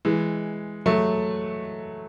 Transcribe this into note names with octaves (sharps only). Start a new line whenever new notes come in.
E3 G#3
F#3 A3